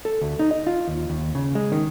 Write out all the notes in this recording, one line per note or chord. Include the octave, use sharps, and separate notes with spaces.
A4
D2
D#4
D#5
F4
D#2
D#2
C#3
G#3
D#3